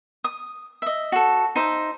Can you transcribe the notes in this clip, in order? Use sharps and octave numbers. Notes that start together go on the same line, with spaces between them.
D#6
D#5 E5
F#4 A4
D#4 C5 E5